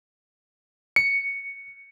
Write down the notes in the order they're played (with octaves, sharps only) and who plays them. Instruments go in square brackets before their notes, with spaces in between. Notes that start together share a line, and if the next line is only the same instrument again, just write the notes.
[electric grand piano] C#7